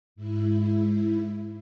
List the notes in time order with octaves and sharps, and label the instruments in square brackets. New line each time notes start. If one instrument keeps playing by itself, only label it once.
[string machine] G#2 E4